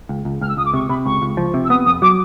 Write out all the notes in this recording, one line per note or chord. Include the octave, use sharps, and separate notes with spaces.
C#2
C#2
C#2 F6
E6
C#2 D#6
D6
C3 C#6
C3 B5
C#2 C#6
C#2
F3
C3
E6
B3 D#6
F2 D#6
F#3 D6